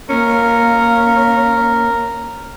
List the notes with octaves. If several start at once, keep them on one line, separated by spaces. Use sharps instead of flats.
A#3 C#4 A#4